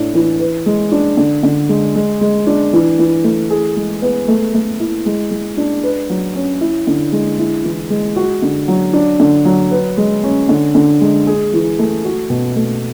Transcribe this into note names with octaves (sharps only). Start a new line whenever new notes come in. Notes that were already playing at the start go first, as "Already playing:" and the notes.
Already playing: A2 D4
E3
B4
G#3
D4
D3
D3
G#3
G#3
G#3
D4
E3
E3
A3
G#4
G#3
B3
A3
A3
E4
G#3
G#3
D4
B4
F#3
C#4
E4
D3
G#3
E4
E3
G#3
F#4
D3
F#3
D4
D3
F#3
B4
G#3
C#4
D3
D3
G#3
G#4
E3
A3
F#4
B2
A3